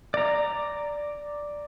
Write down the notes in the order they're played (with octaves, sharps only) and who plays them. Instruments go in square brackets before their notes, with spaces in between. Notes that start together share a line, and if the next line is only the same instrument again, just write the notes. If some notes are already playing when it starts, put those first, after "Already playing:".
[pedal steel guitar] D5 A#5